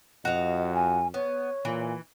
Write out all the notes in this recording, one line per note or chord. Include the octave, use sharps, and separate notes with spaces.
F2 F#4 D#5 F5
G#5
B3 C#5
A#2 E3